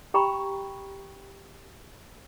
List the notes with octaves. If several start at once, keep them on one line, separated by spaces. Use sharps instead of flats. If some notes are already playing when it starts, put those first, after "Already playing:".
G4 G5 A#5 B5 C#6